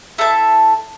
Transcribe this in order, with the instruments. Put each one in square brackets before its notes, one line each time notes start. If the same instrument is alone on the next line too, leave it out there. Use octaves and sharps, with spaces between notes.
[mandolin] E4 A4 E5 A5